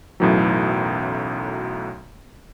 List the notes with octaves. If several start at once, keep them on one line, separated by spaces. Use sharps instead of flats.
B1 F#2 A2 E3 F#3